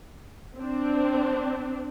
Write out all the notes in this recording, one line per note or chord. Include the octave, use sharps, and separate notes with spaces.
C4 D4